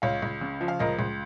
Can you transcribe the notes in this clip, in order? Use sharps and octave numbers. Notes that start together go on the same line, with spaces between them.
C#2 C#5 F5
C#2
C#3
F3
F5
C#2 A#4 D#5
C#2